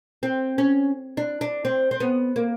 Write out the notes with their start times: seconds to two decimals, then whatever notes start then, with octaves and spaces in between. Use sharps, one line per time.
0.23 C4
0.58 C#4
1.17 D4
1.41 D4
1.65 C4
1.91 C4
2.00 B3
2.36 A#3